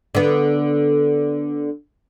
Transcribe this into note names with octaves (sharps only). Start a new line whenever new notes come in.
D3 B3